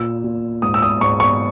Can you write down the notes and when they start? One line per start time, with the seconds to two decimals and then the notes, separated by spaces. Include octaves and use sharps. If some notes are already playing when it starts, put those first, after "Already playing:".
Already playing: A#2 E6
0.24 A#2
0.62 G#2 D#6
0.74 E6
0.82 D#6
1.01 G#2 C#6
1.20 C#6